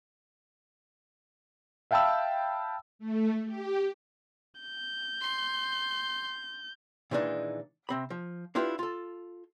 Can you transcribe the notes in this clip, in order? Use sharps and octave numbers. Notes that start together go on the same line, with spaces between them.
E5 F5 G5 A5 B5 E6
A3
G4
G6
C6
A#2 D#3 E3 G#3 D4 D#4
C3 C4 B5
F3
D4 E4 F4 G4 B4
F4 A4